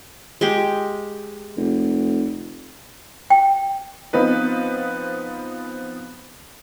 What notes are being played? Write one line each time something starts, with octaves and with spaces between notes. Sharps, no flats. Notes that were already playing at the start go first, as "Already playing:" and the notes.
G#3 G4
F1
G5
F3 B3 C4 D#4 B4